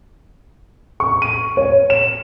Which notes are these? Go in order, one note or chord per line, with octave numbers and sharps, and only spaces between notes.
C#6
D#7
C#5
E7